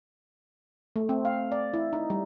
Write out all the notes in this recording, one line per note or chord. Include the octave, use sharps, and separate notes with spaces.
A3
C4
F5
D5
E4
D#4
G3